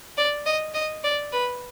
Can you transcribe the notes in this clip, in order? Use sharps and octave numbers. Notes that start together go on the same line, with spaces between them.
D5
D#5
D#5
D5
B4